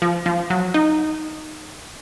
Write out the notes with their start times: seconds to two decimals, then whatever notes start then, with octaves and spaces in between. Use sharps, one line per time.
0.02 F3
0.26 F3
0.50 F#3
0.74 D#4